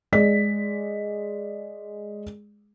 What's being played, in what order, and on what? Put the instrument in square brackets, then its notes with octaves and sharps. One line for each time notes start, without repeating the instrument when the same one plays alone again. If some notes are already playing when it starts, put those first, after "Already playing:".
[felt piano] G#3 G#4 D5 B6